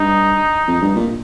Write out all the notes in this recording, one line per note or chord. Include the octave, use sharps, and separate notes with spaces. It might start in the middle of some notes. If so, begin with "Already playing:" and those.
Already playing: G2 D#4
F2
G2
A#2